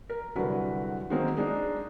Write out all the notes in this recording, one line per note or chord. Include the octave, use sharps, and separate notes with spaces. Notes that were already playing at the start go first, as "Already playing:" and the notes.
A#4
C2 D3 F#3 B4
D#3 F#3 G#3 A#3 C4
G#3 D4 D#4